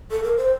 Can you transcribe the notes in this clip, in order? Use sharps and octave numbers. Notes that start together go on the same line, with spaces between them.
A4
A#4
C5